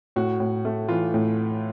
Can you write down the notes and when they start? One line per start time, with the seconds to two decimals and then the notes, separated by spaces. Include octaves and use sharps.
0.16 A2 F#4
0.40 A2
0.65 A3
0.89 E3 F4
1.14 A2